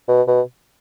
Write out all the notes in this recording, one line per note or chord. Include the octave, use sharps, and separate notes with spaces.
B2
B2